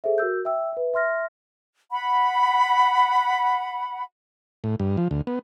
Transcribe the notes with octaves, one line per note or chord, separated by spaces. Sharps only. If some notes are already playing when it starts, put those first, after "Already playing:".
G#4 A4 C5 E5
F#4 A#4 E6 G6
E5 G5 E6
B4 E5
E5 C6 F6 A#6
F#5 B5
A2
G2
F3
D2
B3